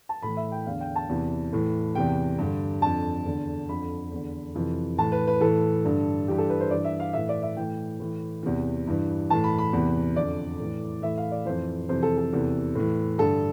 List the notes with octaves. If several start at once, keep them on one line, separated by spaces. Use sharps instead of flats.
A5
A2 E3 B5
E5
G5
E2 D3 F5
G5
A5
E2 C3 E3
A2 E3
E2 C3 E3 G5
G2 D3
F2 D3 A5
E2 D3
F2 D3 B5
E2 D3
F2 C3 E3
A2 E3 A5
B4
B4
A2 E3 A4
G2 D3
G2 E3 G4
A4
B4
C5
G2 E3 D5
E5
F5
A2 E3 E5
D5
E5
A2 E3 G5
A2 E3
E2 C3 E3
G2 E3
A2 E3 A5
B5
B5
E2 C3 E3
F2 D3 D5
A2 E3
A2 E3 E5
F5
D5
F2 E3 C5
F2 C3 E3 C5
A4
A4
E2 C3 E3
A2 E3
G2 D3 A4